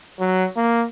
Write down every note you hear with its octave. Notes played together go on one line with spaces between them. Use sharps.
F#3
A#3